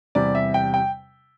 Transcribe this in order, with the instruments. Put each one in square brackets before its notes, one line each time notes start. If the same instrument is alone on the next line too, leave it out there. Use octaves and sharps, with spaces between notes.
[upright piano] E2 C3 G3 D5
E5
G5
G5